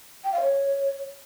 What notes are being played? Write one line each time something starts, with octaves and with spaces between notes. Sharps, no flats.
G5
F5
C#5